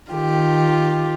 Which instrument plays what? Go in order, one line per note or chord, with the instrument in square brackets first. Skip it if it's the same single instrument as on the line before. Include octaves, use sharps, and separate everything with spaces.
[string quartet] D#3 F4 G4